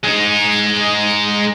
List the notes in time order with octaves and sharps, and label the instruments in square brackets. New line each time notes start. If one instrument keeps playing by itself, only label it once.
[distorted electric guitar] G#3 D#4